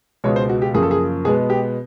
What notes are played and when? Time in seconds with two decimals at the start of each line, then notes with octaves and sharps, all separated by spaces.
0.24 C#2 B2 G#3 C#5
0.36 C5
0.49 F#4
0.62 G4
0.74 F#2 C#3 F3 A#3 G#4
0.83 A4
0.91 G#4
1.25 B2 G#3 B3 G#4
1.50 G4